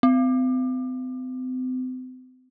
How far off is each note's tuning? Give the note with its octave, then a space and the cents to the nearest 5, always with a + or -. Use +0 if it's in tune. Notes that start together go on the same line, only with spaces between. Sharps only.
C4 -40